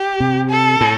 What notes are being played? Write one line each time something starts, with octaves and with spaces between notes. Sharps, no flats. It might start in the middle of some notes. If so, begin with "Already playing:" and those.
Already playing: G4
C3
A4
A2